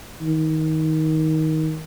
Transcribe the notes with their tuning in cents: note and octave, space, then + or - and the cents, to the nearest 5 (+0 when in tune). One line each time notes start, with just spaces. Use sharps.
D#3 +20